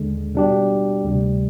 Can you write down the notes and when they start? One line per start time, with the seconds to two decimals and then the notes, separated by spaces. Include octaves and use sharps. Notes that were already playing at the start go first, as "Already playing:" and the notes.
Already playing: D#2 D3 G#3
0.35 B2 G3 D4 G4
1.04 D2 C3 G3